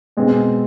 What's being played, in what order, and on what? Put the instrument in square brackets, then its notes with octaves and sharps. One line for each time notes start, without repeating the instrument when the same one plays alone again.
[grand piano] B2 G#3 C4